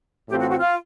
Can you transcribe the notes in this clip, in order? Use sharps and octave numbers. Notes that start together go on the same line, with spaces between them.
A2 E3 A3 C4 F4 G4
F#4
F#4
F4